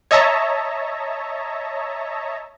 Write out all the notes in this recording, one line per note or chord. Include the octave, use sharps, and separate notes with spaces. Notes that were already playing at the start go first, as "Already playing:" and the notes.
C#5 D#5 E5 A5 A#5